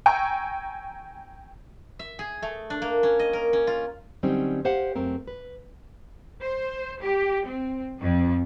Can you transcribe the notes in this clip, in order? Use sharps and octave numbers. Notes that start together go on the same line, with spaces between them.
G5 G#5 A#5 C#6 E6
E5
G#4
A3
D4
A#3
C#4
D#5
A#4
C#4
F4
D3 F#3 G3 C4 C#4 D#4
G4 C5 F5 F#5
F#2 A3 C4 A#4
B4
C5
G4
C4
F2